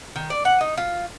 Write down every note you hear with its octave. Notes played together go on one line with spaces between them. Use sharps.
D#3
D5
F#5
D#4
F4